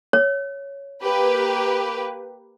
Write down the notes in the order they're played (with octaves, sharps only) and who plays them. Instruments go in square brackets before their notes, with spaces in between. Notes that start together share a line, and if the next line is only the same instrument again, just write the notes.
[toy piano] C#5
[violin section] A#3 G4 B4